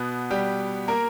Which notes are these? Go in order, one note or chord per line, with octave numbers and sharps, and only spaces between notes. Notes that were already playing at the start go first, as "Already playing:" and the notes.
Already playing: B2 B3
G3 G4
A#3 A#4